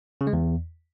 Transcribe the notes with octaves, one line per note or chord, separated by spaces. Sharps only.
C#3
G#3
E2